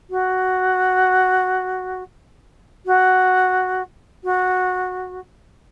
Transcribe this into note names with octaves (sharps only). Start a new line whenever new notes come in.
F#4
F#4
F#4